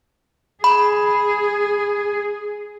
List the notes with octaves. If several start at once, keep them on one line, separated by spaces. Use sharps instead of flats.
G#4 B5